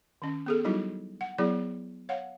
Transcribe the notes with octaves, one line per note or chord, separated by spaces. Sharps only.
D#3 C#4
B3 G#4 A4
F#3 G3 D#4 E4 F#4
F#5
F#3 B3 E4 G#4 D5
C#5 F5 F#5